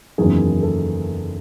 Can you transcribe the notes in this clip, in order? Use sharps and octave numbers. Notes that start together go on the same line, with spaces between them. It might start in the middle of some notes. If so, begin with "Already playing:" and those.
F#1 E2 D#3 F#3 G#4
A4